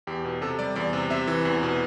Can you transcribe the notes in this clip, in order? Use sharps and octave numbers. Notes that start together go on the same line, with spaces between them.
E2 G4
B2
C3 A4
G3 D5
E2 D5
C3
C3 E5
E3
E2
B2